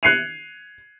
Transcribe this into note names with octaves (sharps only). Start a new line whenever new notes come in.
F#6 G#6 C7 C#7 D#7 F7